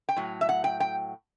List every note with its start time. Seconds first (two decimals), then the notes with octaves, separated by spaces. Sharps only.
0.09 G5
0.17 A2 F#3
0.41 E5
0.49 F#5
0.64 G5
0.80 G5